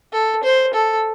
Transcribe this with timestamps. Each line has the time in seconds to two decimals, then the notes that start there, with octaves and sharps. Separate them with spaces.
0.13 A4
0.43 C5
0.74 A4